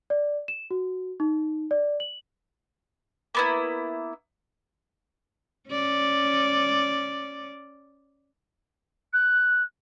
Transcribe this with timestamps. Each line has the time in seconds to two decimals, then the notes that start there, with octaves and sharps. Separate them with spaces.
0.10 D5
0.48 E7
0.71 F#4
1.20 D#4
1.71 D5
2.00 F#7
3.35 A#3 B3 E4
5.69 C#4 D5
9.12 F#6